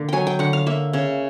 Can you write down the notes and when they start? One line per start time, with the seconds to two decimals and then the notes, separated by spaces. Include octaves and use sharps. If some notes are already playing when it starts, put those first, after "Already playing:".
Already playing: D3 A#3
0.09 F#3 G5 G#5
0.27 G5
0.39 D3 F#5
0.53 F5
0.66 A#3 E5
0.93 C#3